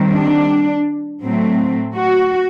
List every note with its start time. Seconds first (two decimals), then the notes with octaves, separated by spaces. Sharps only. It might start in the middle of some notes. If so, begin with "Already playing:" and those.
Already playing: D#3 G3 C4
0.13 D4
1.22 A2 F#3 A3 C4
1.95 F#4